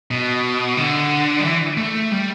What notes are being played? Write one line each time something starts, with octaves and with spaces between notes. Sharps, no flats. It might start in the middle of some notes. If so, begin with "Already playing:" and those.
B2
D3
G3
E3
A3
G3